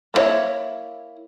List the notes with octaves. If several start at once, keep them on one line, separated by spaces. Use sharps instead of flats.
A#3 B3 E4 C#5 E5